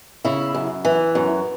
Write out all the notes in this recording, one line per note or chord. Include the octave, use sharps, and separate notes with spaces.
C#3 E4
F#2
E3
F#2